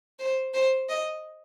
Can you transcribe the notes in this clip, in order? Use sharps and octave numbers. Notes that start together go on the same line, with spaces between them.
C5
C5
D#5